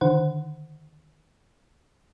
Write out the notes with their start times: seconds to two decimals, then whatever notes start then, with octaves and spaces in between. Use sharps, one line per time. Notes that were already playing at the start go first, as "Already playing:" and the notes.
0.01 D3 D#3 C5 F#5